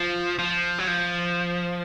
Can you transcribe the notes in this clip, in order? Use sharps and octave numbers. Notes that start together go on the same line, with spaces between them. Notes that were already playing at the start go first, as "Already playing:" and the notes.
Already playing: F3
F3
F#3
F3